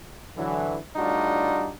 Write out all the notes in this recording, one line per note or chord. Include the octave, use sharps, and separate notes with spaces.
D3 E3 F#3
A2 G3 D4 D#4 F4 F#4